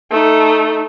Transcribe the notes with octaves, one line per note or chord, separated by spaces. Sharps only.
A3 D#4